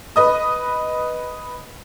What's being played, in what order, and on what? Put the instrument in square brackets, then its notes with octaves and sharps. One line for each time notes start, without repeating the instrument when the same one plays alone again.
[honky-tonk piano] B4 D#5 D#6